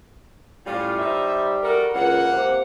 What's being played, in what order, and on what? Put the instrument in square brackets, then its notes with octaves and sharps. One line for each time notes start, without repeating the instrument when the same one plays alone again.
[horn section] A2 C#4 F4 [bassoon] G3
[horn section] D#4 C5 E5
F#4 A4 A#4
[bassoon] C#2 [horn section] A#3 F#5
[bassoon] C3